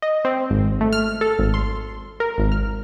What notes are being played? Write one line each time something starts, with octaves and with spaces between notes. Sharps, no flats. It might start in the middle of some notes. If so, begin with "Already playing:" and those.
D#5
C4
G#1
A3
F6
A4
G#1
C6
A#4
G#1
F6